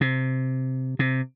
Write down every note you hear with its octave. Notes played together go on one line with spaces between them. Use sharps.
C3
C3